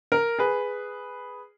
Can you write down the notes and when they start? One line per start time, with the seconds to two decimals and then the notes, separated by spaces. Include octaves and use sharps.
0.12 A#4
0.39 G#4 B4